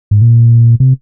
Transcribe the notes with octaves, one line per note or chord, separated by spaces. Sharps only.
G#2
A#2
C3